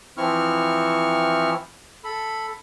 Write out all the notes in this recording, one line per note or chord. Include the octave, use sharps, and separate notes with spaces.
E3 F3 C4 E4 C#6 F6
A4 B5